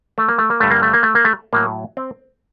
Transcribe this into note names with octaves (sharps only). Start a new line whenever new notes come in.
A3
A#3
A3
A#3
G2 D3 G3 A3
A#3
A3
A#3
A3
A#3
A3
A2 F#3 A#3
C4